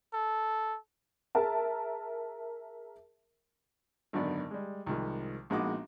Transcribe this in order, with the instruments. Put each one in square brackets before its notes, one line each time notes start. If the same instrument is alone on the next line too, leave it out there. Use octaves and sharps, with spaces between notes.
[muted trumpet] A4
[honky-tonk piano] G#4 A#4 E5 A5
[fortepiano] G#1 F#2 D3 B3 D5
G3 G#3
C2 D#3 F3 G#3
A#1 G#3 B3 D#4 F#4 D6